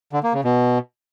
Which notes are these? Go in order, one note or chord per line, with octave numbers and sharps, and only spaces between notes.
D3
A#3
C#3
B2